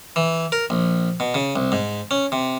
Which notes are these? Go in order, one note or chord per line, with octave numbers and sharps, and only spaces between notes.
E3
A#4
A#1
B2
C#3
C2
G#2
C#4
C3